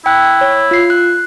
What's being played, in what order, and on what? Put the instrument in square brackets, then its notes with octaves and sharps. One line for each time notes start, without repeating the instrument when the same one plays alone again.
[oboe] E4 [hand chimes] G5 F#6
[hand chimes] C#5
F4 C7
F#6